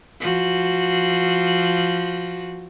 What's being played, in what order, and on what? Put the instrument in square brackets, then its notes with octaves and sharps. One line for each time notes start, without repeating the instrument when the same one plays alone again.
[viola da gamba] F3 F#4